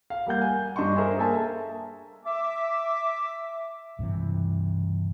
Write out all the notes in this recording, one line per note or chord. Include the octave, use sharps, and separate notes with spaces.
F5
G3 A#3 F#5 G6
G#5
G2 D4 D#5 C6 C#6
G#4 A#4 C5 E5 G#5
A#3 A4 E5 G#5 A5
E5 D6
C#2 G2 C3 E3